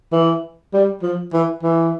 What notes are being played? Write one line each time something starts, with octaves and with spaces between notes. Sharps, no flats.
E3
G3
F3
E3
E3